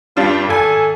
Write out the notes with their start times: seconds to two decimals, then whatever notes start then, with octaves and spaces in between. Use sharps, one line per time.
0.17 G2 G3 D4 F4
0.48 G#1 A4 G#5